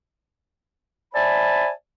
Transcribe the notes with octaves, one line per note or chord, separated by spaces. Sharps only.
C5 D5 E5 G#5 A5 B5